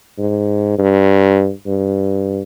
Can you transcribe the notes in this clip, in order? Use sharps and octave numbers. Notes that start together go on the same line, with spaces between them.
G#2
G2
G2